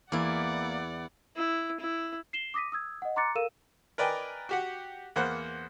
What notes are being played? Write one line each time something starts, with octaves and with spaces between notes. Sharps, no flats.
E2 A#3 E4 D5 F#5
E4
E4
C7 E7 G7
D6 D#6 A#6 B6 D#7
D#6 E6 G#6
D#5 F#5
A#5 C6 D6 F#6 A6 C#7
A4 A#4 F5 E6 D#7 E7
A#4 B4 D5 D#5 G5 G#5
F#4 G4 F#5
E2 A#3 C5 F#5 F#6